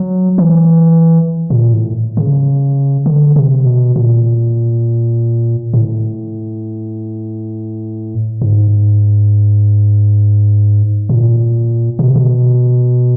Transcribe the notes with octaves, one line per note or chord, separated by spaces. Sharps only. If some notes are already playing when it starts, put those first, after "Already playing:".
Already playing: F#3
E3
A#2
A2
C#3
D3
C3
B2
A#2
A2
G#2
A#2
B2
C3
B2